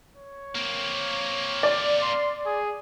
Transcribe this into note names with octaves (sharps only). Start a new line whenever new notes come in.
C#5
A#3 C4
D5
C6
G#4